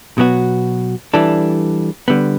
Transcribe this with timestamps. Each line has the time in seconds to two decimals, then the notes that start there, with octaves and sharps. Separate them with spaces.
0.18 B2 F#3 B3 F#4
1.14 E3 G3 D4 A4
2.08 D3 G3 B3